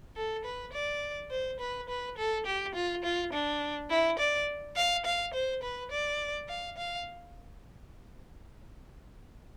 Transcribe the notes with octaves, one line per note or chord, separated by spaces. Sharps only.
A4
B4
D5
C5
B4
B4
A4
G4
F4
F4
D4
E4
D5
F5
F5
C5
B4
D5
F5
F5